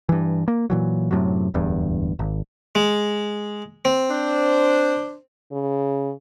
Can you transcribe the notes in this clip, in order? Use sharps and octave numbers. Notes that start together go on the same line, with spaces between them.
G2 E3
A#3
A#2 E3 F#3
F#2 A2 C3 F#3
D1 E2 G2
G#1
G#3
C4
D4 C5
C#3